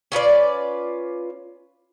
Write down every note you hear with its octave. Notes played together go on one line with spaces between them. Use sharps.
C#4 F4 B4 D5